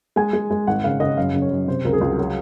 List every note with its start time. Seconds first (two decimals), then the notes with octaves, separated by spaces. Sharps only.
0.16 G#3 G#5
0.33 G#3
0.51 G#3
0.67 G#1 F#5
0.84 C#3 F5
1.00 C#3 D#5
1.17 F#2 F5
1.34 C#3
1.42 C#5
1.50 F#2
1.67 C3 C5
1.85 C#2 A#4
1.93 G#4
2.01 C#2
2.10 F#4
2.18 F#3 G#4